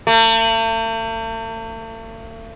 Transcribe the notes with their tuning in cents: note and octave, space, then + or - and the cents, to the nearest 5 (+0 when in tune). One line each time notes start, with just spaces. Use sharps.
A3 +45